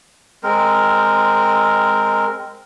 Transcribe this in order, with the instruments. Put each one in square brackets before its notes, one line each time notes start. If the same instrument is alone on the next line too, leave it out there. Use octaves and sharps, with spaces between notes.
[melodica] G#3 C4 A#4